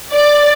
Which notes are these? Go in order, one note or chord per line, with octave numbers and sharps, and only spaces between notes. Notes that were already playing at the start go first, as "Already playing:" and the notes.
D5